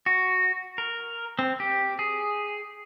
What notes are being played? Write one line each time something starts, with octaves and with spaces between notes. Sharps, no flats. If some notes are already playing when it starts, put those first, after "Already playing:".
F#4
A#4
C4
G4
G#4